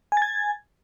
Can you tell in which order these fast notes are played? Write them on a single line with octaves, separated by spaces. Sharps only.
G#5 A6 G#6